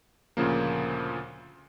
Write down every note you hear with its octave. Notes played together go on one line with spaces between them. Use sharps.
D2 A#2 C#3 F3 A#3